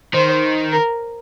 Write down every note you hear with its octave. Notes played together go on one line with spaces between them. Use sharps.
D#3 C5
A#4